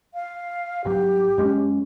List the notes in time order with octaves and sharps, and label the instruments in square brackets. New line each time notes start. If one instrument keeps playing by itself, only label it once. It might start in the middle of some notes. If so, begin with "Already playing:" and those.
[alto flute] F5
[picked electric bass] G#1 G2 F#3 [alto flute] G4
[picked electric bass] F#2 G#3 C#4